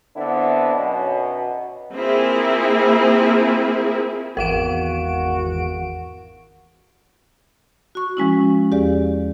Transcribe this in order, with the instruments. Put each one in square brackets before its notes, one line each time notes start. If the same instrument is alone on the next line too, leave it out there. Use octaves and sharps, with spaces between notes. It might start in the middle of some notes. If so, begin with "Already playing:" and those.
[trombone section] D3 B3 C4 D4 E4
B1 F#2 B2
[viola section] A#3 C4 E4 F4 G#4
[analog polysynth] G#1 E2 D7 [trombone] F#4 [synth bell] A#4 F5 E7
[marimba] F#4 C#6
F3 G#3 C#4 E4
E2 G4 G#4 D5 F5